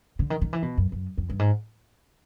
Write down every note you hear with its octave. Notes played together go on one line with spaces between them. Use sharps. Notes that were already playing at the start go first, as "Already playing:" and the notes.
D3
D#3
D#3
E3
B2
F#2
F#2
F2
G2
G#2